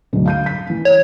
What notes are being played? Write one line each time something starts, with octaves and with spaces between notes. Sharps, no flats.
D2 G#2 F#3
F5 G6 D#7
B6
E3
C#5